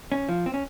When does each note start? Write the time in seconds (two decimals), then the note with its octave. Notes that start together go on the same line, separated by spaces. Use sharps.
0.12 C#4
0.29 F3
0.46 C4
0.54 C#4